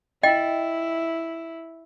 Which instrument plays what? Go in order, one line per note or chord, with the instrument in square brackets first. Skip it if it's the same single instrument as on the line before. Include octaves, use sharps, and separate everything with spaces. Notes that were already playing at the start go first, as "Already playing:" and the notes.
[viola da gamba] E4 [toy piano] D#5 G5